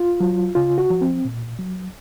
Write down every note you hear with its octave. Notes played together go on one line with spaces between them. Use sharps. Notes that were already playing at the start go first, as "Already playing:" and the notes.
Already playing: F4
F#3
C#3 F4
F#4
F3
C4
A#2
F#3